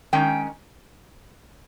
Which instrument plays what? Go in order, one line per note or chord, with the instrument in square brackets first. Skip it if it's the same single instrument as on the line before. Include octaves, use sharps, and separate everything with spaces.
[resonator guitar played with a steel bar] D#3 G#3 C#4 G5